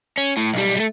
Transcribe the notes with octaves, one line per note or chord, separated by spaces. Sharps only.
C#4
A2
B1 G3
G3 A3